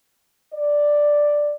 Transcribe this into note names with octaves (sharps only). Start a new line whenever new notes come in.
D5